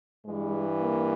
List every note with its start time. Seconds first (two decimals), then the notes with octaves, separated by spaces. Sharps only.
0.25 G2 E3 G#3
0.80 A#3